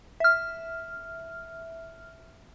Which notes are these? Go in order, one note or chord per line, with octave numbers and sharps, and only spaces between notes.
E5 F6